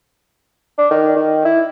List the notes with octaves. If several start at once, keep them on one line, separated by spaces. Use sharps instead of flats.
D4
D#3
D#3
E4